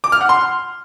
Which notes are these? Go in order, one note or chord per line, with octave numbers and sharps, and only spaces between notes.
D6
F6
F#5
C6